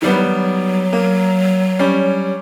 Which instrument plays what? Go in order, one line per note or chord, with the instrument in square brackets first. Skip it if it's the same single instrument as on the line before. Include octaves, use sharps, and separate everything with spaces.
[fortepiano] D#3 G3 B3 [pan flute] F#3
[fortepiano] A#3
G3 C#4